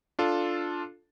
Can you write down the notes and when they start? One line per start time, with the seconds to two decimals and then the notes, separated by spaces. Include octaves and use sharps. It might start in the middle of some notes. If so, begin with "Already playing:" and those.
0.19 D4 F4 A4